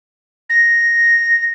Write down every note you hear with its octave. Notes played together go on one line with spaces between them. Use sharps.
A#6